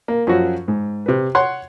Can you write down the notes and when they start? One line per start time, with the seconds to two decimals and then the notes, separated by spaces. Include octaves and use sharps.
0.08 A#3
0.27 F#2 F3 F#3 C#4 F#4
0.68 G#2
1.06 C3 B4
1.35 C#5 F#5 C6